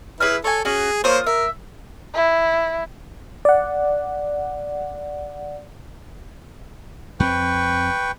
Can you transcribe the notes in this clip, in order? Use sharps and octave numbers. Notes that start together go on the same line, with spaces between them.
E4 G#4 B4 C#5 F6
A4 C#5 G#5
C#4 F#4 G#4
A#3 F4 C5 C#5 D#6
A#4 E5
E4
D5 F#5
F2 C4 B4 G5 C#6